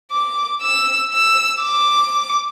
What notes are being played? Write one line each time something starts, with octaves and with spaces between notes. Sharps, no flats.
D6
E6
E6
D6